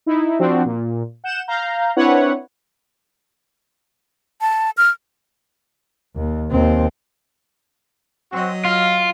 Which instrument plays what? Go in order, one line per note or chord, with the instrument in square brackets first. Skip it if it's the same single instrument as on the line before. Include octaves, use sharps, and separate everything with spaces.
[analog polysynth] D#4 E4
F3 C4 D4 F#4
A#2
F#5 G6 E7
F5 A#5 G6
C4 D4 E4 B4 C#5 F#5
[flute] A5
F6
[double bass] D#2
D#2 C4
[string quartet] F#3 D#5 [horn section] C4 F#4
[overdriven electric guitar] F4 [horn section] F5